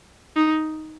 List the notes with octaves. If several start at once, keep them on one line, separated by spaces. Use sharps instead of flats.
D#4